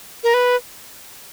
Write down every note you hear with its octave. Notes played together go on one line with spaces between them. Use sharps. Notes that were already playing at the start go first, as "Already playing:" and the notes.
A#4
B4